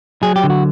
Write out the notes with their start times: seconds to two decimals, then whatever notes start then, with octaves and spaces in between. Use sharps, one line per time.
0.23 F#3 G#4
0.36 G4
0.44 D3
0.50 F#4